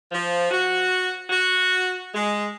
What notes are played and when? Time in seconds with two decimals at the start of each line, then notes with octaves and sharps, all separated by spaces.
0.12 F3
0.51 F#4
1.30 F#4
2.14 G#3